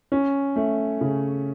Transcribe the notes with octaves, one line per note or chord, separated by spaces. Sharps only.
C#4
A3
C#3